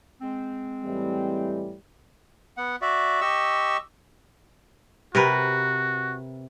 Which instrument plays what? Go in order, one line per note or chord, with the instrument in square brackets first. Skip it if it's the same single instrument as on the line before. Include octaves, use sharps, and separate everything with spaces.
[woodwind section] G#3 C4
[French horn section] A2 E3 G3
[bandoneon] B3 F#5
F#4 D5 E5
G4 D#5 C#6 E6
[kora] C3 A#4 B4 [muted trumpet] F#4